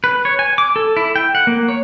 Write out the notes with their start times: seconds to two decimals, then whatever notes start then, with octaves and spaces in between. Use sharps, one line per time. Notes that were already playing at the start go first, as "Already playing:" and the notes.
0.04 B4
0.25 C#5
0.39 G#5
0.58 D6
0.76 A4
0.97 E4
1.16 G5
1.35 F#5
1.47 A#3
1.68 C#5